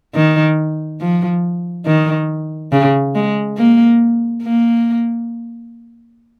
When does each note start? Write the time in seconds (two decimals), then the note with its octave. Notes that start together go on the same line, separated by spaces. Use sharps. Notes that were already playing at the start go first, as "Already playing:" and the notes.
0.15 D#3
1.00 F3
1.86 D#3
2.72 C#3
3.15 G#3
3.57 A#3
4.43 A#3